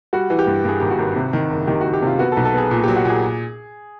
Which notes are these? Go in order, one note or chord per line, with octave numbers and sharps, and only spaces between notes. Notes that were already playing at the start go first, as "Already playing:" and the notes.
G3 F#4
E3
G4
G2
G2 G#4
G#1 G4
F#4
G#1
C3
D#3
F#1
D#3 G4
F#1 F#4
G4
C3 F4
B3 F#4
A4
B1
A4
B3 G#4
A#2
F#3 G4
F#4
A#2 G#4